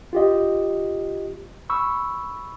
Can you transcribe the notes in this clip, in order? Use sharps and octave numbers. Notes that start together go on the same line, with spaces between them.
F4 G4 D#5
B5 C#6 E6